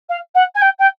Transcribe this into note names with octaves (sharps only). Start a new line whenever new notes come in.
F5
F#5
G#5
G5
G5